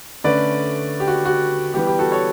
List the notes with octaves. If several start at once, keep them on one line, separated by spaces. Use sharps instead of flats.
D3 A3 C#4 B4 D5
G4
F#4
F#4
E3 G3 B3 G4
G4
F#4 A4
A4 C#5